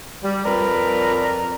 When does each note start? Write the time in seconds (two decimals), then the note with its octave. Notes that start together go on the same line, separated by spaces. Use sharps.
0.24 G3
0.46 F2 A#4 B4 D5